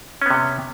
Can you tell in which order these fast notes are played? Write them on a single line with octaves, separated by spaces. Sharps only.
C#4 B3 C3